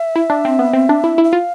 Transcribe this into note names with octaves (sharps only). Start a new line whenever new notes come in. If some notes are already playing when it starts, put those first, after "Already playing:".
Already playing: E5
E4
D4
C4
B3
C4
D4
E4
E4
E5
F4 F5